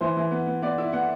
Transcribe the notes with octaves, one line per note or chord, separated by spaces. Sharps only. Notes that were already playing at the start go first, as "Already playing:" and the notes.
E3 C5
E3
B3
B3
B3 D5
E4 E5
B3 F#5